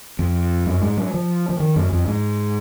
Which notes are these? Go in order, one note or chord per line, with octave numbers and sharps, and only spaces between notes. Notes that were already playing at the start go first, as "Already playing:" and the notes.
F2
F#2
G#2
F#3
F3
F3
D#3
F#2
F2
G#2